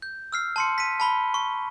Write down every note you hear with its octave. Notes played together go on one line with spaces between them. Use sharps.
G6
E6 F6 C7
A5 C6 C#7
B6 D#7
A5 B5 G7
C#6